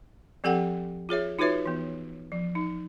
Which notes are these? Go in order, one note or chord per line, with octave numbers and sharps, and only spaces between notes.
F3 C4 G4 A4 F#5 G5
F4 G#4 C#5 E5
D#4 F4 F#4 B4 C#5 E5
E3 B3
F3
D#4